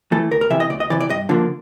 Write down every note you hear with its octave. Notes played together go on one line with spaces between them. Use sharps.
E3 A3 A4
D2 A#4
A#4
C3 E3 E5
D#5
D2 D5
D#5
C3 E3 D5
D5
G2 D#5
D3 F3 A#3